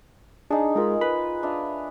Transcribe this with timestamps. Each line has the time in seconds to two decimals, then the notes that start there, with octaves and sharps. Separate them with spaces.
0.51 D4 D#4 G#4
0.76 G#3 F4 A#4 B5
1.01 B4 B5
1.43 D4 E5 F5